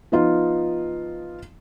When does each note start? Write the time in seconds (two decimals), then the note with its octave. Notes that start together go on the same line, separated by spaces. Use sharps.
0.12 F3 B3 D#4 F4